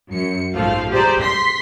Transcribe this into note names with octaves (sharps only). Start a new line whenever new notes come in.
F#2 C#7
A#1 G#2 F3 A3 F5
G4 G#4 C5 D5 A#5
C6 B6